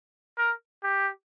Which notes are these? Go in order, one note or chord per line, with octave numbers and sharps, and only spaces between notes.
A#4
G4